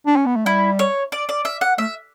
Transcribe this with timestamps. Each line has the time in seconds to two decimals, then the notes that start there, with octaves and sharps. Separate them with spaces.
0.06 D4
0.16 C#4
0.26 B3
0.36 A3
0.46 G3 E4
0.79 C#5
1.12 D5
1.29 D5
1.45 E5
1.61 F#5
1.78 A3 E5